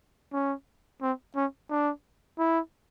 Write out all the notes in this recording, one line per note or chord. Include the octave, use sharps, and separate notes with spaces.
C#4
C4
C#4
D4
E4